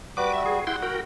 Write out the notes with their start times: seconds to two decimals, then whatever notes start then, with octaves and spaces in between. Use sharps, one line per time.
0.17 G3 F#4 B4 D6
0.33 E5
0.46 G#4
0.67 E4 F#5 G5 C6
0.82 F#4 A#4 G5